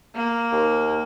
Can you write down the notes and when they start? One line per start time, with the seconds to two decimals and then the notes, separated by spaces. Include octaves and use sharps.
0.15 A#3
0.52 D#2